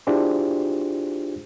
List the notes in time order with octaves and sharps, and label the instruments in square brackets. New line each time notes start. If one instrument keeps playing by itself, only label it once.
[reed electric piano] D4 E4 F4 G4 G#4 C5